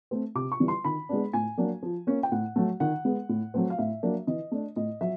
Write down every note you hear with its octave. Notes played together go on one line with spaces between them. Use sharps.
A3 C4
C3 D6
C#6
E3 G3
C6
D#3 B5
G#3 B3 D4
A2 G#5
F#3 A#3 D4
F3
A#3 C#4
G5
A2 F#5
F#3 A3
D#3 F#5
G#3 B3
A2
F#3 A3 C4
F5
A2 E5
F#3 A#3 D4
E3 D#5
A3 D4
A2 D#5
F#3 E5